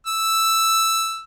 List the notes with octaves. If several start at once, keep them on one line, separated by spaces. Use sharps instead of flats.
E6